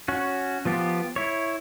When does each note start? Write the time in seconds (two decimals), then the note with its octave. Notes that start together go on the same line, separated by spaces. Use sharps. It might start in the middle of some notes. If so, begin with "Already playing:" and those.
0.08 C#4 F#4
0.65 F3 B3 F4 G4
1.16 E4 C#5